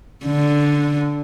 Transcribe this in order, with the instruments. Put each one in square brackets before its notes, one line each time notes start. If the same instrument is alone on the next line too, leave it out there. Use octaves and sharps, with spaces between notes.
[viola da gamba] D3